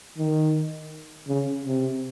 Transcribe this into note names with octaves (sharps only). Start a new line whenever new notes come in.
D#3
C#3
C3